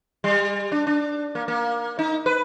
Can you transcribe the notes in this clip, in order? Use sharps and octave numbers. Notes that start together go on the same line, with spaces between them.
G3
D4
D4
A#3
A#3
D#4
B4